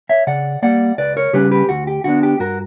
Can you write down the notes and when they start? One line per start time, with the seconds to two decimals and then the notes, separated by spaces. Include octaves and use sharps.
0.09 C#5 E5
0.27 C#3 D5 F#5
0.62 G3 A#3 D5 F#5
0.98 C#2 B4 D5
1.17 A#4 C#5
1.33 C#3 G3 C#4 G4 B4
1.51 G4 B4
1.69 D2 F#4
1.87 G4
2.04 D3 G3 B3 D4 F#4
2.23 G4
2.39 G2 F#4 A#4